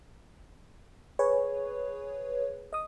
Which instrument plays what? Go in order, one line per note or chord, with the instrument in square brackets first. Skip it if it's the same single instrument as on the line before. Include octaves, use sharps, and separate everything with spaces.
[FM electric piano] G#4 B4 C#5
D#5 D#6